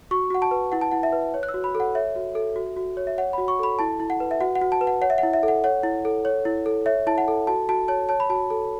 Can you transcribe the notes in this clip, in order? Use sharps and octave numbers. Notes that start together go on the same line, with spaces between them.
F#4 C#6
F#4 F#5
A5
B4
E4 F#5
A5
E4 F#5
E5
B4
C#5
F#6
E6
F#4
B5
A4
F#5
C#5 E5
F#4
A4
F#4
F#4
C#5
E5
C#5 F#5
F#4 B5
C#6
A4 B5
E4 A5
E4
F#5
B4
E5
F#4 F#5
F#5
F#4
A5
B4
F#5
C#5 F#5
E5
F#5
E4
E5
A4
F#5
C#5 F#5
E4
A4
C#5
E4
A4
C#5 E5
E4 A5
F#5
A4
F#4 A5
F#4 A5
C#5 A5
C#5 A5
B5
F#4 A5
A4